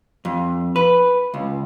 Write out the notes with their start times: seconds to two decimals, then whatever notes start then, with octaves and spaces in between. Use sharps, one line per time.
0.25 F2
0.76 B4
1.34 C#2